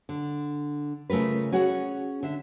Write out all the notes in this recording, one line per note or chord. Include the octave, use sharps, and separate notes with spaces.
D3
C#3 A3 F4 A#4 B4
C#4 F#4 G#4 F#5
D3 E5